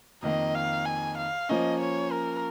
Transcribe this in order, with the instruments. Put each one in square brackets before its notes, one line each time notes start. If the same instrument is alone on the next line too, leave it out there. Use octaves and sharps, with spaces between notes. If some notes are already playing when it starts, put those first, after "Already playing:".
[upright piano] F2 D#3 A#3 [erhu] D#5
[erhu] F5
G#5
F5
[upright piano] F3 A#3 C#4 [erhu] D#5
[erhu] C#5
A#4